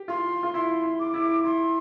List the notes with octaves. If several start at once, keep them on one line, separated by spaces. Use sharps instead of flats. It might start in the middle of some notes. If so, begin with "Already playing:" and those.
Already playing: G4
F4 C6
F4
E4 C6
E4
D6
E4
E4 C6